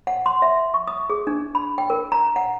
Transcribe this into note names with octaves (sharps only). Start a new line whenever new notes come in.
F#5
C6
E5
C#6
D#6
G#4
D4
B5
G5
A#4
A#5
F#5